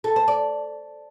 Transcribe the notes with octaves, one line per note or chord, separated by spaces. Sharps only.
A4
C5
D5